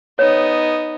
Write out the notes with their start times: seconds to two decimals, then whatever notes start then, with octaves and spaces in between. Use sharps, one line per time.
0.19 B3 D#4 C#5